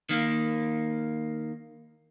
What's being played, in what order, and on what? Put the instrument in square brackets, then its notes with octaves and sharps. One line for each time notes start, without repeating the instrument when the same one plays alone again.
[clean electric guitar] D#3 A#3